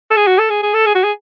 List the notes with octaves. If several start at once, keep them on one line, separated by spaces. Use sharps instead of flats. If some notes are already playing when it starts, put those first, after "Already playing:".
A4
G#4
F#4
A4
G#4
G#4
A4
G#4
F#4
G#4